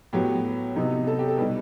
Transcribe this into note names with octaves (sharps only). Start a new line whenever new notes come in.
A2 F#3 B3 G4
C3 F#3 B3 D#4
A4
G4
A4
B2 G3 D#4 B4